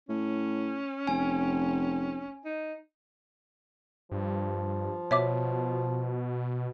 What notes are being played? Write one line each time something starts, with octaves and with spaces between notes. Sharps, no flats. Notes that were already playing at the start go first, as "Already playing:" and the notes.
A2 C#4
F1 G#5
D#4
G2 F3
B2 C#5 E5 D6